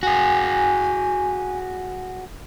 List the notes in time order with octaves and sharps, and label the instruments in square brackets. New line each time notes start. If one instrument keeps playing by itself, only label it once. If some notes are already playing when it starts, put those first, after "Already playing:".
[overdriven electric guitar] F#4 G#4 [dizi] G#5